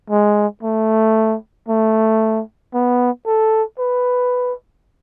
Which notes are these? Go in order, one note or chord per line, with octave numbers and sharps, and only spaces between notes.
G#3
A3
A3
B3
A4
B4